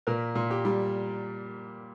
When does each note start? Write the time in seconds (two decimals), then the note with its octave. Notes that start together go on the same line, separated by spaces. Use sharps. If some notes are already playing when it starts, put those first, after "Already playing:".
0.07 A#2 A#4
0.35 A#2
0.50 G4
0.65 G3